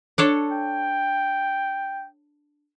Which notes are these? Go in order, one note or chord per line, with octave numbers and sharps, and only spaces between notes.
D4 A4 C#5
G5